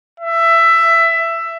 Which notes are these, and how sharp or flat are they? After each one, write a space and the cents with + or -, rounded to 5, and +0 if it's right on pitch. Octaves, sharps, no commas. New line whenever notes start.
E5 +15